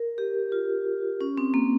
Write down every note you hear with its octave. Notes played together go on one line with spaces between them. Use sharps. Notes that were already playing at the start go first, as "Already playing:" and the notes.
Already playing: A#4
G4
F4
C#4
C4
A#3